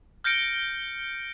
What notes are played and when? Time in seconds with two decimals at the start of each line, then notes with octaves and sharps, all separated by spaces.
0.24 F6 G6 A#6 C#7 D7